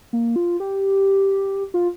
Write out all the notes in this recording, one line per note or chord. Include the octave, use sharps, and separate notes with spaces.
A#3
F4
G4
F4